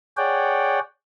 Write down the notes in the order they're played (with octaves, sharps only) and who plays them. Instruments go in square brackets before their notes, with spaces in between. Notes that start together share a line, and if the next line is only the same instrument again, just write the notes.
[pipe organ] G#4 C#5 D5 F#5 G5